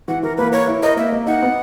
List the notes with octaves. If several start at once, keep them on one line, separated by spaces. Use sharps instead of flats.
E3 F#5
E3 A#4
A#3 B4
A#4 C#5
E4
A#4 D#5
A#3 E5
A#3
D#4 F#5
B3